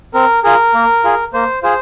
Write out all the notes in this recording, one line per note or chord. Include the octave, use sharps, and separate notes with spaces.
C4 A#4
F4 G#4 A#4
A#3
F4 G#4
A#3 C5
F4 G#4 C5